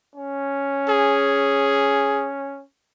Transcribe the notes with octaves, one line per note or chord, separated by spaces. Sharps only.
C#4
G#4